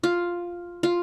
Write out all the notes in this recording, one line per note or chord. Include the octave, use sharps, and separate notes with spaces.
F4
F4